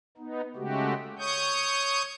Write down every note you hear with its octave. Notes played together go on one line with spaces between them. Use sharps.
B3 D#4
C#3 G#3 A3 F#4 G4
C#5 C#6 D#6 G6